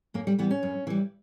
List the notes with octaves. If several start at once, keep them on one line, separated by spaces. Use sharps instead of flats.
F#2 A#3
G3
E3 G3 B3
C#4
F#2
E3 G3